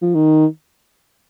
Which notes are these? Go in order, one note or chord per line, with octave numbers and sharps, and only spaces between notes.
F3
D#3